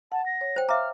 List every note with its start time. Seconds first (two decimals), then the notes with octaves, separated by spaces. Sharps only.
0.12 F#5 A5
0.26 A#6
0.41 C#5
0.56 C5 G5
0.69 E5 F5 A#5 D6 F6